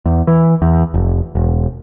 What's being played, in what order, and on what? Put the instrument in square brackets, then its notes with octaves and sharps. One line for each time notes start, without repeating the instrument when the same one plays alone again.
[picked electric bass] E2
E3
E2
F1
E1